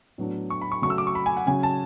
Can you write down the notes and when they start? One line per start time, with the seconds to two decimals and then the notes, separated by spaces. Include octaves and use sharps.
0.18 A2 F#3 B3 D4
0.50 C#6
0.61 B5
0.72 C#6
0.82 C#3 F#3 A3 C#6
0.90 E6
0.98 D6
1.07 C#6
1.15 B5
1.26 G#5
1.37 F#5
1.47 C#3 F#3 C#4 G#5
1.63 A5